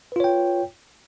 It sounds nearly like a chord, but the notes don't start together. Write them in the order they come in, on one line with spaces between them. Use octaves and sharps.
B4 F4 C#5 G5